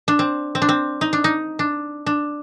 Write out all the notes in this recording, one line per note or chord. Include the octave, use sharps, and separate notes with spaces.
D4
C4
C4
D4
C4
D#4
D4
D#4
D4
D4